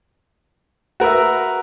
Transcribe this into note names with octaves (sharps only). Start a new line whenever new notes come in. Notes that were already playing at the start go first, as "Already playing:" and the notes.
F#4 A#4 B4 E5